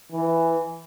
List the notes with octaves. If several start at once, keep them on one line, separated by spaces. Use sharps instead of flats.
E3